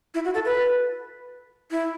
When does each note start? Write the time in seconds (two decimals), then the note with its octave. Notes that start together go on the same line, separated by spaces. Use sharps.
0.14 E4
0.25 F#4
0.34 A4
0.45 B4
1.71 E4